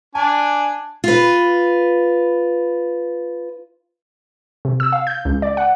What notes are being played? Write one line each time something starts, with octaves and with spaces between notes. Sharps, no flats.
D4 G#5 A5
F4 B4
C3
E6
F5
G6
C#2
D5
F#5